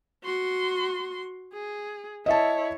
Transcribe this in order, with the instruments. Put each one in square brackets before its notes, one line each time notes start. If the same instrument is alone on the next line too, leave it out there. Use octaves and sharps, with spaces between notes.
[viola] F#4 C6
G#4
[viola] E4 C#5 [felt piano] D#5 E5 A5